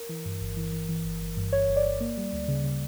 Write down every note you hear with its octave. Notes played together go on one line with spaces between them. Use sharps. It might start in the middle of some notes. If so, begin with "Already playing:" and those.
Already playing: A#4
E3
G2
G1
E3
E3
E3
G1
G1
G2
G1 C#5
G1
D5
G1
A#3
G3
D2
C#3
C#3